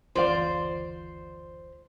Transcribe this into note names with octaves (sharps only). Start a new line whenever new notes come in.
F#1 D2 E3 F4 C5 D5 F5